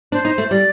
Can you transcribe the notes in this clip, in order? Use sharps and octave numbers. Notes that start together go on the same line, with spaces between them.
D4 C5
D#4
A3
G3 D5